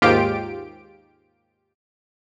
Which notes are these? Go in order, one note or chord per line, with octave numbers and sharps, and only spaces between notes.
D#2 G#2 F4 G4 D7